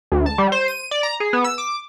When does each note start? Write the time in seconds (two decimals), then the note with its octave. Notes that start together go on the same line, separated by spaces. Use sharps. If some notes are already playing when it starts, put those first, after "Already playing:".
0.12 D2
0.26 A5
0.38 G3
0.52 C5
0.68 D#7
0.91 D5
1.03 A#5
1.20 G#4
1.33 B3
1.44 E6
1.58 D6